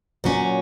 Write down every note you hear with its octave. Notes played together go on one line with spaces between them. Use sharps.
A#2 F#3 C#4